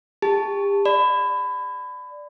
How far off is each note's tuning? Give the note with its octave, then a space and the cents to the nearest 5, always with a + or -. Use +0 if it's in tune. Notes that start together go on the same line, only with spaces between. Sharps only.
G4 +35 A5 +0
D5 +0 B5 +25